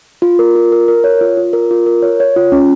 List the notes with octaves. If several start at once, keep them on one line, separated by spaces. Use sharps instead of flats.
F4
A#4
F4
A#4
A#4
C#5
F4
F4
A#4
F4
A#4
C#5
C#5
F4
C#4